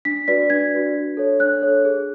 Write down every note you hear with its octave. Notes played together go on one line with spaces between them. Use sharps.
D4 B6
F#4 B4 D5 B6
D4 G#6
F#4 B4 D5
D4
A4 C#5
D4 F#6
A4 C#5
G#4